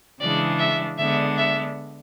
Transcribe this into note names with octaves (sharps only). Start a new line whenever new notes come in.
C#3 E3 G#3 D4 D5
E5
D3 G#3 B3 D4 E5
E5